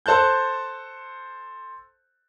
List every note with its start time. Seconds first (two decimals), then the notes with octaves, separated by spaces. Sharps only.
0.06 A4 C5 A5 F#6 G6